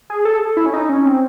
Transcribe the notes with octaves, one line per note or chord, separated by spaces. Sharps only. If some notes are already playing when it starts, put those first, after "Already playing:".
G#4
A4
E4
C#4
D#4
C#4
C4